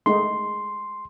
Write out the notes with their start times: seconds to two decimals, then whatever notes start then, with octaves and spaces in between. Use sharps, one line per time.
0.06 G#3 A3 D#4 C6